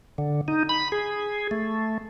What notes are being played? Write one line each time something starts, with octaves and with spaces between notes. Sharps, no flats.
D3
D#4
B5
G#4
A3